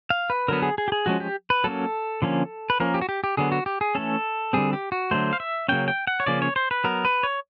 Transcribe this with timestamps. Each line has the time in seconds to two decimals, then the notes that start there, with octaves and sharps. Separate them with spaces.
0.10 F5
0.30 B4
0.48 D3 F#3 B3 A#4
0.62 G#4
0.78 G#4
0.88 G4
0.92 G#4
1.06 F3 G#3 C#4 F#4
1.20 G4
1.50 B4
1.64 F#3 A#3 C#4 A4
2.22 D3 F3 A#3 C#4
2.70 B4
2.80 F3 A#3 C#4 A#4
2.94 G4
3.01 F#4
3.09 G4
3.24 G4
3.37 D3 F#3 B3 G#4
3.52 F#4
3.66 G4
3.81 G#4
3.95 E3 A3 C#4 A4
4.53 D3 G3 C4 G#4
4.73 G4
4.92 F#4
5.11 D3 F#3 A3 C5
5.33 F5
5.40 E5
5.68 C#3 F#3 A#3 C#4 G5
5.88 G5
6.07 F#5
6.20 C#5
6.26 C#3 F3 A#3 C#4 D5
6.42 C#5
6.56 C5
6.71 B4
6.84 F#3 B3 A#4
7.05 B4
7.23 C#5